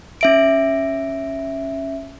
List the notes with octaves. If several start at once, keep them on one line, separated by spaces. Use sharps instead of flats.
C#4 E5 D7